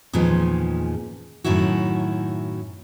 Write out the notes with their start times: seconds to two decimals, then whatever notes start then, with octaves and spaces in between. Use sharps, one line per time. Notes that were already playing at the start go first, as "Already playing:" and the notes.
0.13 E2 A#2 D#3 F3 G#3 C#4
1.44 F#2 A2 D#3 C#4 E4 F#4